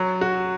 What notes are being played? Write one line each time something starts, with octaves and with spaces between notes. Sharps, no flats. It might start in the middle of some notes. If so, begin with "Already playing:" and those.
Already playing: F#3
F#4